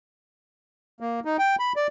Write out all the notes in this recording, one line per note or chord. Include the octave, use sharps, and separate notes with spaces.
A#3
D#4
G5
B5
D5